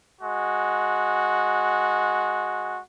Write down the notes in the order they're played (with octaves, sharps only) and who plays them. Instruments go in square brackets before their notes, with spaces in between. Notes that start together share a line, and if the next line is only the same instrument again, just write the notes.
[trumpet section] G#3 F#4